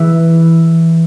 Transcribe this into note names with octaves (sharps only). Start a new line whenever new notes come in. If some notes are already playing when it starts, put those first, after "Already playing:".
Already playing: E3 E4